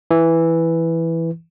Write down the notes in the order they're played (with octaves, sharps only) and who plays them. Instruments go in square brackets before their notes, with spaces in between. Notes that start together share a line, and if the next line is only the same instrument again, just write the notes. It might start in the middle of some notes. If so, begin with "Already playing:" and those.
[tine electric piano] E3